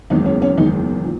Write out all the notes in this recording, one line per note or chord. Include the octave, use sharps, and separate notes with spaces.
F#1 E2 D#3 G#3 D#4
C#4
C#4
F#1 E2 D#3 G#3 D#4
A#2